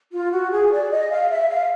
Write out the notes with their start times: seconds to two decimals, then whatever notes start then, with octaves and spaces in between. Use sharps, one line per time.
0.12 F4
0.31 F#4
0.51 G#4
0.71 D5
0.91 D#5
1.10 F5
1.31 E5
1.50 F5